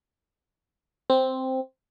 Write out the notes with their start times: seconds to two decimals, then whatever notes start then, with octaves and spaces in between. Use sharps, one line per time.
1.10 C4